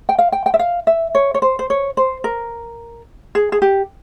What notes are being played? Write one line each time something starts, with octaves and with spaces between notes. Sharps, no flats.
G5
F5
G5
G5
E5
F5
E5
C#5
C#5
C5
C5
C#5
C5
A#4
G#4
G#4
G4